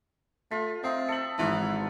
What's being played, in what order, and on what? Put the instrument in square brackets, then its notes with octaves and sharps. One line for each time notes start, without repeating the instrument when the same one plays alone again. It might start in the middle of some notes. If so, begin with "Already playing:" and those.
[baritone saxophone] A3 [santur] F4 [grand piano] B6
[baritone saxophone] C4 [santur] D#4 [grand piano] E5 F5
[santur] A4 E5 [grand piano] C#7 F#7
[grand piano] G#1 G#2 D#6 [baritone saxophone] E3 [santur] E4 F4 F#5